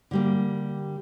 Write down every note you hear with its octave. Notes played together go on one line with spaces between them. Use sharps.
D3 G3 A#3